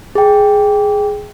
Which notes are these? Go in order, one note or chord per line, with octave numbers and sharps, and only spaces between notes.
G#4 G5